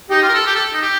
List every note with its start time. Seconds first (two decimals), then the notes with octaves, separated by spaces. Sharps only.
0.10 D#4 G4
0.23 F4
0.29 A#4
0.34 A4
0.46 G4
0.55 A4
0.73 D#4
0.82 G4